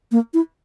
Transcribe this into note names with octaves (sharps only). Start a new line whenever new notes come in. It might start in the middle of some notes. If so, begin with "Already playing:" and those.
A#3
E4